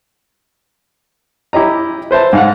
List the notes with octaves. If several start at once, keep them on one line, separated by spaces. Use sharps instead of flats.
E4 G4 D#5 A#5
B4 C5 E5 A5
G#2 F5 F#5